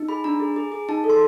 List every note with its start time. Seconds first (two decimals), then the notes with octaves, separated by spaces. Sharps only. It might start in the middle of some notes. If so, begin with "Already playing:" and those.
Already playing: D#4
0.09 G#4 B5
0.24 D4 A#5
0.40 G#4
0.56 G#4
0.72 G#4
0.89 D#4 A5
1.04 A4
1.09 C6